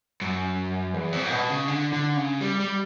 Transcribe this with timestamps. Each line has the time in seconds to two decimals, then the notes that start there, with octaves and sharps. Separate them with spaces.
0.22 F#2
0.94 E2
1.12 F2
1.31 B2
1.50 C#3
1.68 D3
1.93 D3
2.17 C#3
2.41 G3
2.60 G3